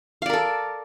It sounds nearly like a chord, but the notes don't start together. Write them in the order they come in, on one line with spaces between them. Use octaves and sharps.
F5 D5 A#4 A4